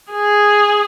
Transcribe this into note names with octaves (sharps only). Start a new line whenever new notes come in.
G#4